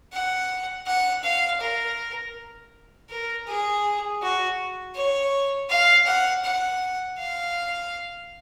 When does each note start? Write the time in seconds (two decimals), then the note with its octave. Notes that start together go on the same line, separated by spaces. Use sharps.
0.12 F#5
0.86 F#5
1.23 F5
1.61 A#4
3.10 A#4
3.47 G#4
4.21 F#4
4.95 C#5
5.70 F5
6.06 F#5
6.44 F#5
7.18 F5